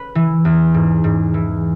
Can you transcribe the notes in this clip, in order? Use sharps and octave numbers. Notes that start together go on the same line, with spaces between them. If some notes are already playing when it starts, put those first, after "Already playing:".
Already playing: B4
E3
E2
G#2
G#2
E3